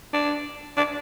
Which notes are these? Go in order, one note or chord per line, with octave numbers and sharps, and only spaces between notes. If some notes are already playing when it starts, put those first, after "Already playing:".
D4
D4